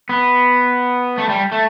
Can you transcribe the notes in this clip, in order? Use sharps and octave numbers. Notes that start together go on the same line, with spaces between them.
B3
A3
G3
A3